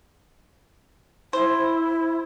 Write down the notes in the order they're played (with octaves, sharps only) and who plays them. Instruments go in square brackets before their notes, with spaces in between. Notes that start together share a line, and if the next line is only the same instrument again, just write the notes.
[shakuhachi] E4 [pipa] C5